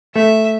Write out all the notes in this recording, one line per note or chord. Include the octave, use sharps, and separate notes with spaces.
A3 E5